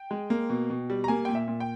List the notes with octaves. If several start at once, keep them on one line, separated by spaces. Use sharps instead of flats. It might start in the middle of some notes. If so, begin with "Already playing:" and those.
Already playing: G5
G#3
A#3
B2
B2
G3
A#5
A#3 G#5
A#2 G5
E5
A#2
G5